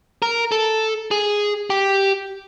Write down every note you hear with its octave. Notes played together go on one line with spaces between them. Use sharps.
A#4
A4
G#4
G4